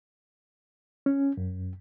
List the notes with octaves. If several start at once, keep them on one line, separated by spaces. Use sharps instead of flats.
C#4
F#2